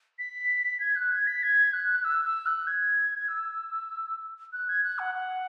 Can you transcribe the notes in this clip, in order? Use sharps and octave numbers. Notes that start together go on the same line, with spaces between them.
B6
G#6
F#6
G#6
B6
G#6
F#6
E6
E6
F#6
G#6
E6
F#6
G#6
F#6
F#5
F#5